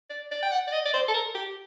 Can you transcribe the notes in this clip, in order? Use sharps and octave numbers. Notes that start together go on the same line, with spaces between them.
D5
D5
G5
F#5
D5
D#5
D5
C5
A4
A#4
G4